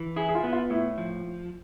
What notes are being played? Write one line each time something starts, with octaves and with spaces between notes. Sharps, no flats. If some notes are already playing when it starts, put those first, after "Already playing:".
Already playing: E3
E4 G#4
G#4
F4
B3
F4
A2 E4
F3